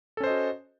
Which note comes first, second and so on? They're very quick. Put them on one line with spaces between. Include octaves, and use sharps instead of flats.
A4 C#4 C5 D#5 F#4